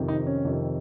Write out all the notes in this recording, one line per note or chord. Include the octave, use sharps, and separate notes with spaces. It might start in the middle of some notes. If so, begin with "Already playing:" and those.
Already playing: F2 C3 D#3
D#4
C#4
F2 C3 D#3